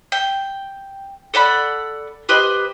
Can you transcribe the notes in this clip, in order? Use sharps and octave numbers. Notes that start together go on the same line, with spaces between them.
G5
A4 D5 F#5 B5
G4 B4 C5 D#5